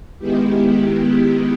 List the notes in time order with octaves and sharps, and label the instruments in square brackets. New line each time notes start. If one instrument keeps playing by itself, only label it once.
[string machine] D#3 G#3 B3 E4 G4